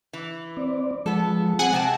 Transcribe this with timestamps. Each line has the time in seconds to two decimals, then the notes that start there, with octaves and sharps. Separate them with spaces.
0.13 E3
0.57 C4 D5
1.06 F3 G#3 B3 A4
1.59 C4 G#4 F#5 G#5
1.72 C3 G#4 G5 A5